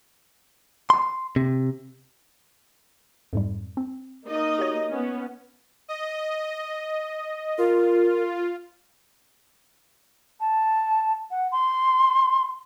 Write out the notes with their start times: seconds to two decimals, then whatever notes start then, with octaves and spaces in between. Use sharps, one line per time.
0.90 C6
1.36 C3
3.33 F2 G#2 G3
3.77 C4
4.26 A#3 D#4 D#5
4.59 F#4 G4 C#5
4.90 B3 C#4
5.88 D#5
7.58 F4 A#4
10.40 A5
11.30 F#5
11.51 C6